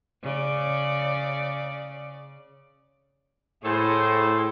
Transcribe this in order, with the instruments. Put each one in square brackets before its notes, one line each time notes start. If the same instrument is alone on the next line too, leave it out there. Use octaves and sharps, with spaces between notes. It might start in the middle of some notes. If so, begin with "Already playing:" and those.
[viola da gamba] C#3 D5
[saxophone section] A2 [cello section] G#4 [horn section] A4 C5